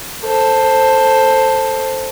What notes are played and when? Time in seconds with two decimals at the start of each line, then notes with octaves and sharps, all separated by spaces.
0.23 A4 C5